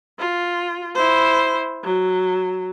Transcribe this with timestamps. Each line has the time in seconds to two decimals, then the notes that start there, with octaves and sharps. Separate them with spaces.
0.19 F4
0.95 E4 C5
1.84 F#3